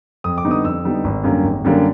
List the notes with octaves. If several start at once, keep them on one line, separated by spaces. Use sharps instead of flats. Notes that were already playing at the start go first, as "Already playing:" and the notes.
F2 D#6
D6
D3 G3 B3 D#4
D#6
F2 E6
D3 G3 B3 D#4
G#1
F#2 D3 G3 A#3
G#1
F#2 D3 G3 A#3